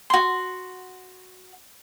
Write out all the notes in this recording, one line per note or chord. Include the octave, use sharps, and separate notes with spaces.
F#4 C6